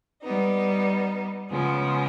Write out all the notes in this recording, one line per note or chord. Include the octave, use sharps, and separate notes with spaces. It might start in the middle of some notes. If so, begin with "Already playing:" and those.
G3 B3 D#4
C#3 F3 G#3 B3